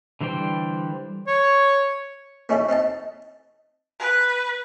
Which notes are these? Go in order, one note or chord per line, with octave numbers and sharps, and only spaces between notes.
D3 E3 G3 C5 G5
C#5
A#3 C#4 D#4 E4 A4
C4 D#4 D#5 A5
B4